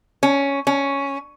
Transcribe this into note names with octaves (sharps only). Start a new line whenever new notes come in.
C#4
C#4